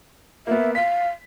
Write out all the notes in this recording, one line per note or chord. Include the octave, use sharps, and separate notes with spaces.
A#3 B3 E5
F5 B6